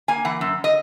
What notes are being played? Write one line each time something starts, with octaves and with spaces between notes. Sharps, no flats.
A#3 G#5
E3 F#5
F#2
D#5